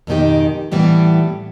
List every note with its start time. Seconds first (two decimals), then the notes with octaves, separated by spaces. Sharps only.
0.07 F2 G#2 B2 D#3 D#4 G4
0.72 A2 E3 G3 B3 G4